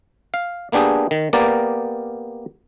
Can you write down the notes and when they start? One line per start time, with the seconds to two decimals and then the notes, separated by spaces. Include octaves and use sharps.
0.34 F5
0.72 A#3 B3 D4 G4 G#4
1.11 D#3
1.33 A#3 B3 G4 A#4 D5